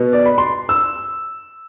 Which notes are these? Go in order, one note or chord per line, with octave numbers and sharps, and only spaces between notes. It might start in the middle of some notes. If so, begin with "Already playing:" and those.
Already playing: B2 B3
D5
B5
C6
E6